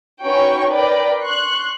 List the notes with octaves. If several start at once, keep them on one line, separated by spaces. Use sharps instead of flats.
C#4 D#4 F#4 B4 G5 C#6
A#4 B4 D5 G5
C6 C#6 F#6